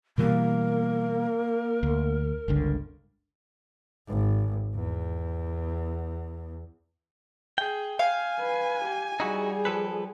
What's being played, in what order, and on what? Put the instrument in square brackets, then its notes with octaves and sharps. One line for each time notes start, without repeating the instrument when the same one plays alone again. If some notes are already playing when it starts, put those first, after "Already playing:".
[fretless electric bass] B2 E3 G3 [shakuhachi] A#3 [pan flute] A#4
[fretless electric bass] D2
G1 C#2 D3
[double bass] G#1
E2
[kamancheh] G#4 [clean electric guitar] G5
[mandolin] F5 [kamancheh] G#5
[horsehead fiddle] B4
G4
[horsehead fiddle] G3 G#4 [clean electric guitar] D#4 E4 F#4
[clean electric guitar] F3 A4 B4